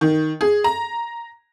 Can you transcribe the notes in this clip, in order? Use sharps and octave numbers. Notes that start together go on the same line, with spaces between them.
D#3
G#4
A#5